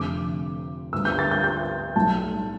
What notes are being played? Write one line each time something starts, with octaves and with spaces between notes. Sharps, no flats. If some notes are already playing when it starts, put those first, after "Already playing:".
Already playing: F1 F2 D3 A3 C4 D6
D2 D3 G3 B3 E6
G6
A6
G6
G6
B1 A2 G3 A5